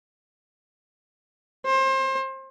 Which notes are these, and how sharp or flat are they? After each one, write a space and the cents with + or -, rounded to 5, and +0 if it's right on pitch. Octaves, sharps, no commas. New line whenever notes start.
C5 +30